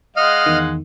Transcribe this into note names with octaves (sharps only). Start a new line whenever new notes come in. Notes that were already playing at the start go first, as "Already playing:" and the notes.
G#3 D#5 F5 F#5 F6
E2 D#3